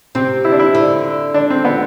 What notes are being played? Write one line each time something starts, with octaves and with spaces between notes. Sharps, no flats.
C3 C4
E4
D4
E4
D3 E4
D4
C4
B3